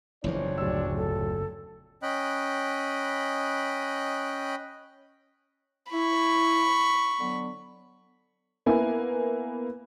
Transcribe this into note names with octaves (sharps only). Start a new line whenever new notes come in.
F#1 E2 E3 F3 C4 D4 C#5
D1 D5 E6
A4
C#4 D#5 G5 B5 F#6
E4 B5 C#6
D3 F#3 B3
A#3 B3 E4 G#5